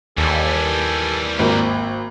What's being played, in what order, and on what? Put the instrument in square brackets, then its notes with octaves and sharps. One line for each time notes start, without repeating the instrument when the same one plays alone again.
[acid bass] D#2 [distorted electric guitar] E3 G3 [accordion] A4 G#5
[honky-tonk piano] G#1 A#3 [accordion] C4